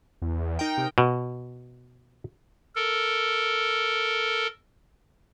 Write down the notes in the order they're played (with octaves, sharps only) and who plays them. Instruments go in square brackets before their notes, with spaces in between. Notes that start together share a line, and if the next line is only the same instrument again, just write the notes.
[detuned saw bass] E2
[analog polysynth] D#4 A#4 G5
[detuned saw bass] C3
[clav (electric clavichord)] B2
[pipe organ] A4 A#4